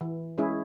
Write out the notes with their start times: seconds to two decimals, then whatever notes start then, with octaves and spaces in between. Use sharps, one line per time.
0.01 E3
0.38 G#3 C#4 E4 G#4